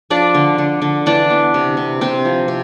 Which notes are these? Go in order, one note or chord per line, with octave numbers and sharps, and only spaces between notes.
F3 D4 D5
D3
D3
D3
E3 D4 D5
B3
C3
C3
C3 C4 C5
F3
C3